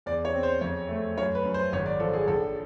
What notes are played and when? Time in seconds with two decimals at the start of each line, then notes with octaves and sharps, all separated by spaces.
0.06 E2 D5
0.25 C#5
0.34 C4
0.43 C5
0.61 F2 C#5
0.89 A3
1.17 F#2 C#5
1.35 B4
1.45 F#2
1.54 C5
1.73 G#1 C#5
1.86 D5
2.00 F3 A4
2.14 G#4
2.28 A#1 A4